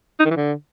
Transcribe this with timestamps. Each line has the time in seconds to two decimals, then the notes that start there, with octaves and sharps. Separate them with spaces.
0.20 D#4
0.25 D#3
0.31 E3
0.36 D3